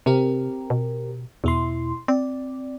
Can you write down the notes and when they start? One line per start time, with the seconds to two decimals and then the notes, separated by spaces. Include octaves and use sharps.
0.06 C3 C4 G4 A#4
0.70 B2
1.44 E2 B2 E4 C6
2.08 C4 D5